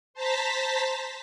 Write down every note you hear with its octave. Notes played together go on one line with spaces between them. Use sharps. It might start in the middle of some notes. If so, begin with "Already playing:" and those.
C5 A5 A#5 A6 B6